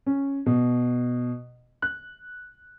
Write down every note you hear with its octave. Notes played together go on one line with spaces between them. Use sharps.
C#4
B2
F#6